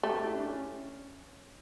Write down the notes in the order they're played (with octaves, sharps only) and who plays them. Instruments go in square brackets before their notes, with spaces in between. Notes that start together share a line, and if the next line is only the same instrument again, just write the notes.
[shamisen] A3 [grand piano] G4
[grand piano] G4
E4
D4
C#4